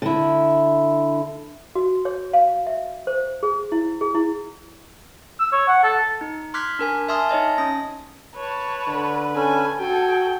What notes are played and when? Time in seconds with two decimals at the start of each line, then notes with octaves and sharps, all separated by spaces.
0.02 D3 E4
1.75 F#4
2.05 C#5
2.33 F5
2.67 E5
3.07 C5
3.43 G#4
3.72 E4
4.01 G#4
4.15 E4
5.39 E6
5.52 C#5
5.68 F#5
5.83 A4
6.21 D#4
6.54 C6 D6 F6 F#6 G#6 B6
6.79 D4 A#4 G#5
7.08 E5 G#5 A5 C6 D#6 F6
7.29 D#4 C#5 D#5 A5
7.58 C#4 D#6 A#6
8.36 B4 C#5 A5
8.87 D3
9.35 C#4 A4 G#5
9.80 F#4 A4 G5 G#5